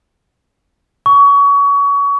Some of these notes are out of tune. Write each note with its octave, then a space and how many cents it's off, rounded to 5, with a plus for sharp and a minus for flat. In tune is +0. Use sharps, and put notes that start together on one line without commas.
C#6 +30